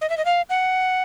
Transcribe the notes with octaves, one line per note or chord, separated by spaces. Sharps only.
D#5
E5
D#5
F5
F#5